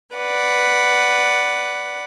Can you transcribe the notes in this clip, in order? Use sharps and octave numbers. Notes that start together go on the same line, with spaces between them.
B4 D5 F#5